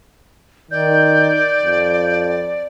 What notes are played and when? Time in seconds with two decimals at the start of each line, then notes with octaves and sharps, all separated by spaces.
0.71 D#3 D5 G6
1.63 F2